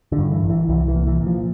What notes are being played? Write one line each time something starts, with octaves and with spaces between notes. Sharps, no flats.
D3
G2
E3
A1
E3
C2 E3
E3
A#2
E3
A#2
F3